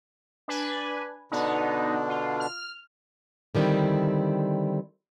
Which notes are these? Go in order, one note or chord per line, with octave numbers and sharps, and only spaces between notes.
D4 B4 G#5
B2 D3 B3 D4 D#4
F4
F6
D3 D#3 G3 C4 E4